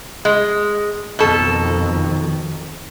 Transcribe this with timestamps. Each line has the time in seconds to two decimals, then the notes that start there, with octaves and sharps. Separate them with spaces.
0.25 G#3
1.19 F2 B2 D#3 A4